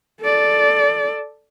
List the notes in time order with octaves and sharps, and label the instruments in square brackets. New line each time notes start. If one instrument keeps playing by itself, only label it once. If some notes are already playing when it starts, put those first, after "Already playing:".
[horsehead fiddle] A4 D5